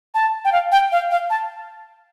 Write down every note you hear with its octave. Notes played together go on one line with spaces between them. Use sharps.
A5
G5
F5
G5
F5
F5
A5